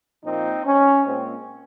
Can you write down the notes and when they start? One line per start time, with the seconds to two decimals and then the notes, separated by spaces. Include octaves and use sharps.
0.23 A#2 F3 A#3 C4 D#4
0.64 C#4
1.04 A#2 G#3 C4